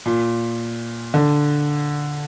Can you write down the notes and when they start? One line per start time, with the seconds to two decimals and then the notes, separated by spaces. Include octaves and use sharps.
0.06 A#2
1.14 D3